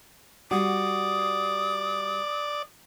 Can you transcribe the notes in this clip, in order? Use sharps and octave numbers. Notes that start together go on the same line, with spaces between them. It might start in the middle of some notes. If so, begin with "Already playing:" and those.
G3 F#4 D5 D#6